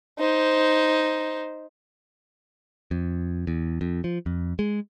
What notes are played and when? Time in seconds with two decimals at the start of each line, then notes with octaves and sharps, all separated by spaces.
0.19 D#4 C5
2.91 F2
3.47 E2
3.81 F2
4.04 F3
4.26 F2
4.59 G#3